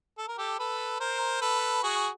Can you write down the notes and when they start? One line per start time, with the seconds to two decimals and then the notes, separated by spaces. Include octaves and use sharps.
0.18 A4
0.28 A#4
0.38 G4 A4
0.59 A4 B4
1.00 A#4 C5
1.41 A4 B4
1.83 F#4 G#4